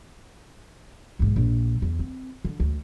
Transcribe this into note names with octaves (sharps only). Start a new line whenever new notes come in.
B1 G#2
A#1
E2
C4
D3
D2